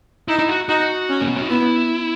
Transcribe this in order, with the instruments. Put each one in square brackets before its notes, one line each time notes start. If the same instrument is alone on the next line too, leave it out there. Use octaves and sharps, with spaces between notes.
[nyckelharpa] D#4 [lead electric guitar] E4
[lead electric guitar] E4
F#4
[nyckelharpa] D#4 [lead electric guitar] F#4
[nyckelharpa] C#4
[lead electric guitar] A#3
B3
C#4
D#4
[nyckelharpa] B3 [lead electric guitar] E4